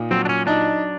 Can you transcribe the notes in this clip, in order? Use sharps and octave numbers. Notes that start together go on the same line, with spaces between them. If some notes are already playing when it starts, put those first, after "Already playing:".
Already playing: A#2 D#4
F#3 C4
D4
C#4
D4 D#4